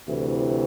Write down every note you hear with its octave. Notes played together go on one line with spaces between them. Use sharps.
D2 C3 E3 E4